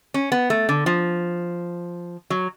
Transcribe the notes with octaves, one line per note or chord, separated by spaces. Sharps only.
C#4
B3
A3
D3
F3
F#3